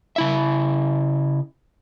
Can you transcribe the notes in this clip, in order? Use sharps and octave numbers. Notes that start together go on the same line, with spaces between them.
C#3 E4 E5